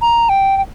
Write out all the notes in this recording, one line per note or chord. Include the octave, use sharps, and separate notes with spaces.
A#5
G5
G5